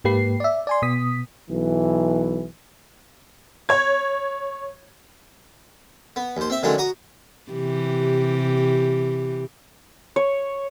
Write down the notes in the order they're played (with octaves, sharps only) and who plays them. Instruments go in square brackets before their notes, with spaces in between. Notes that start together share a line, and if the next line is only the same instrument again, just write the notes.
[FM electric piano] G#2 A#3 G4 B4 C7
D5 E5
D5 G#5 C6
B2 B3 D#6 B6
[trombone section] B1 E3
[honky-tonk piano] C#5 G#6
[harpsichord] B3
D#2 C5
C4 E5
D3 D#3 F#3 G#3 A3 C#4
F#4 A#5 D#6
[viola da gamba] C3 E3 G4
[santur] C#5